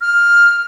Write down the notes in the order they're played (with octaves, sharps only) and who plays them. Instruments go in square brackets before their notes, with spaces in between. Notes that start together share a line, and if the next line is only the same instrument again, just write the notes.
[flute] F6